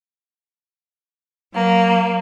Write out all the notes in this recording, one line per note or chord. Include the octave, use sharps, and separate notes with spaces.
F#3 A#3